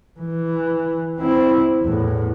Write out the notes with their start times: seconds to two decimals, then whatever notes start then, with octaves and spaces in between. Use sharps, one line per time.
0.20 E3
1.19 C4 E4
1.82 E2 A2